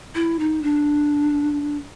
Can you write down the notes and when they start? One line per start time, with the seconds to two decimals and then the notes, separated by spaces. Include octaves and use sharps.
0.15 E4
0.39 D#4
0.62 D4